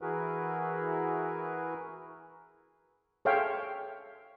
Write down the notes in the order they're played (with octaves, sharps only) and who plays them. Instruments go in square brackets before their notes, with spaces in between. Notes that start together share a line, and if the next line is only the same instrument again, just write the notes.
[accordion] E3 E4 F#4 G#4 A#4 B4
[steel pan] G#4 A4 C#5 E5 F5 G5